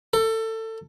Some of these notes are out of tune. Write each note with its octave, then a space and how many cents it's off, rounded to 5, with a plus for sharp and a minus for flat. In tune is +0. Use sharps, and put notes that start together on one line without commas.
A4 +25